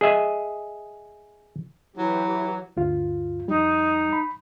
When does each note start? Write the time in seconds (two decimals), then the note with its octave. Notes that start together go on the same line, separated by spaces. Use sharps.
0.01 G#4 D#5 E5 G#5
1.97 E3 F#3 E4 G4
2.77 D2 G2 F4
3.48 F2 G3 D#4
4.13 B5